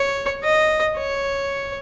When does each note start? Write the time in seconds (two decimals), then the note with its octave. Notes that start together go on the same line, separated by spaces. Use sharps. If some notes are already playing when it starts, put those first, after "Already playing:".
Already playing: C#5
0.44 D#5
0.98 C#5